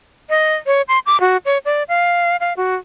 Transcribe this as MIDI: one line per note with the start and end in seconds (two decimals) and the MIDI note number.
0.29 0.54 75
0.66 0.82 73
0.88 0.99 84
1.06 1.19 86
1.20 1.37 66
1.45 1.58 73
1.65 1.83 74
1.88 2.36 77
2.40 2.53 77
2.57 2.75 66